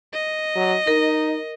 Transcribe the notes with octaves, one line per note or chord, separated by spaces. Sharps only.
D#5
F#3
D#4 A#4